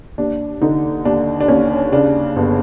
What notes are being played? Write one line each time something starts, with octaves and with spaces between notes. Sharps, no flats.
D#2 D4
D3 D#4
D#2 D4
D4
D#2 C#4
C#3 D4
G1